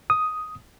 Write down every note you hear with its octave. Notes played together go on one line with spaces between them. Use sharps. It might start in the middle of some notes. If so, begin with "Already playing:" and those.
D#6